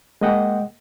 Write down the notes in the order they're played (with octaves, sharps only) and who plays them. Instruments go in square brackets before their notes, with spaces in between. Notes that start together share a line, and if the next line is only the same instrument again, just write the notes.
[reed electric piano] G#3 A#3 D#5 F#5 G5